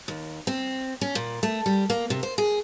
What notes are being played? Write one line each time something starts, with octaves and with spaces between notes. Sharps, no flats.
D#2
C4
C#4
A#2
A3
G3
A#3
C3
C5
G#4